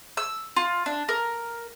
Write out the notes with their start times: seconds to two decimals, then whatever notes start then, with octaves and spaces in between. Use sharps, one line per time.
0.17 E6
0.56 F4
0.86 D4
1.09 A#4